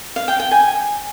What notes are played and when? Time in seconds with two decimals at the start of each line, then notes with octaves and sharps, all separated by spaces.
0.16 F5
0.28 G5
0.40 G5
0.51 G#5